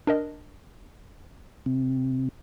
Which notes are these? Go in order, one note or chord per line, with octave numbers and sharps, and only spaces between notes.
D4 A#4 D#5
C3